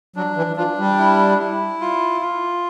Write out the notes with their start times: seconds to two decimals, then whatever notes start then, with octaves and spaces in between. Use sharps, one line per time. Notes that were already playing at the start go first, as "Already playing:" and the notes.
0.16 F#3 D4
0.36 E3
0.57 F3 D4
0.78 G3
0.98 E4
1.39 E4
1.81 F4
2.21 F4